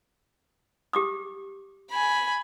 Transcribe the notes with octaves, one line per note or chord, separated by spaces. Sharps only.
G4 D6 D#6
G#5 B5